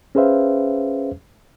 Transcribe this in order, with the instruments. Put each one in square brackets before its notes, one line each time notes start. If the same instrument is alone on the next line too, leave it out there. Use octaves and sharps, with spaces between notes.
[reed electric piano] C#4 G#4 B4 C5 E5 F5